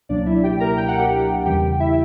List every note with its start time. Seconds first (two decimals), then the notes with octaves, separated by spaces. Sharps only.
0.09 C#2 B2 F#3 A#3 D4 D5
0.26 E4 E5
0.43 G4 G5
0.60 A#4 A#5
0.77 G5
0.88 F#5
0.98 G4 G5
1.45 E2 C#3 E3 G3 G4 G5
1.80 E4 E5